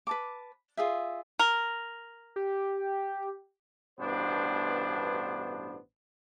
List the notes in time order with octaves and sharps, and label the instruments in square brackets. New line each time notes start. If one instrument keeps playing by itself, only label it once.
[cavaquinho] B4 A5 D6
F4 G#4 E5
[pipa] A#4
[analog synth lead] G4
[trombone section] A1 G2 B2 B3 D4 C5